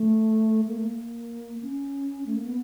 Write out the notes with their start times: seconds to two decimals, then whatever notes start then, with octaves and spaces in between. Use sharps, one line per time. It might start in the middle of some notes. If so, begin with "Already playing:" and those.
Already playing: A3
0.68 A#3
0.78 A3
0.86 A#3
1.62 C#4
2.26 A3
2.36 A#3
2.46 B3